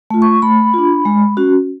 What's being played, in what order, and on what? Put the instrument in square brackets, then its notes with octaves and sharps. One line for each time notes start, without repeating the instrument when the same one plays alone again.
[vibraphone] A3 F4
C#6
A3 B5
D4 F4
G#3
C#4 F#4